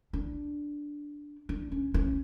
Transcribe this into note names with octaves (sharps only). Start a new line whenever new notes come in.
D4
D4
C#4
C#4